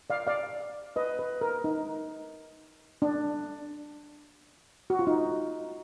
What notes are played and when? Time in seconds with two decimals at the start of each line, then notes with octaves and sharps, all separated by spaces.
0.10 D5 F5
0.27 D5 F5
0.96 B4 D#5
1.19 B4
1.41 A#4
1.64 D#4
3.02 D4
4.90 F#4
4.99 F4
5.07 D#4